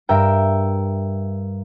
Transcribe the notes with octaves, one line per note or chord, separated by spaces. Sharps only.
G2 A#4 E5 G5 A#5